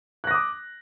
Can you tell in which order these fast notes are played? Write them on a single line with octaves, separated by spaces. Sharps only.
F#6 A#6 D#6 D6